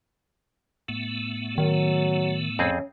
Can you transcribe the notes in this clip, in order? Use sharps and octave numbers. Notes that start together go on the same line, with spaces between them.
A2 A3 B3
D#3 F#3
F2 C4 C#4 G#4